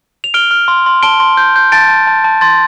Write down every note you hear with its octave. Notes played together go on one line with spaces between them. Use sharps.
F7
F6 D7 G7
F6
C6
C6
A5 D7 G7
C6
G6
G6
A5 A6 D7
A5
A5
A5
C6 A6